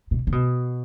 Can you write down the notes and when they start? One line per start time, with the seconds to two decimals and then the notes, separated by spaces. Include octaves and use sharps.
0.11 B2
0.27 C#3
0.32 B2